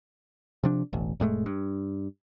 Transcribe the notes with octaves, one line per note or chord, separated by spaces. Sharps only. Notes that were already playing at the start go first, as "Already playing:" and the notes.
C3 F3 D4
E1 A1
F1 A2 G#3 A3
G2